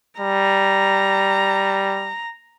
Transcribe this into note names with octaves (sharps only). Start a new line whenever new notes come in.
G3 A#5